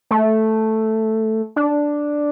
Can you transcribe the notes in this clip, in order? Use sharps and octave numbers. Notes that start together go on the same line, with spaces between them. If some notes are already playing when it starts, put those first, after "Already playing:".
A3
D4